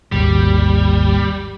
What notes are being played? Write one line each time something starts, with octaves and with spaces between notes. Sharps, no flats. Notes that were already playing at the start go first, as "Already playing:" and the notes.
G#1 D#2 G3